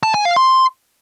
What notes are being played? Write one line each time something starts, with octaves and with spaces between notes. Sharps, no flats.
A5
G#5
F5
C6